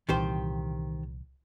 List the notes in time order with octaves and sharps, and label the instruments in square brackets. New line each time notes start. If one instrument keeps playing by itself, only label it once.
[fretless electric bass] C2 A#2 E3 [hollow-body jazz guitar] D#3 G4 C5